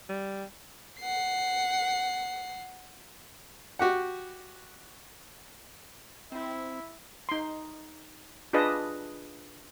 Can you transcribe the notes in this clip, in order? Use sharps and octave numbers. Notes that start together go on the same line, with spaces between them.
G3
F#5 C7
F#4 G4 F#5
C4 E4
D#4 C6
D4 F4 G#4 B4 D#5 A5